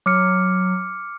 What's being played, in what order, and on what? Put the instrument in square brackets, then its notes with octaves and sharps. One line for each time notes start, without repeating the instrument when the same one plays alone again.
[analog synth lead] F#3 [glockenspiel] D6 F6 C#7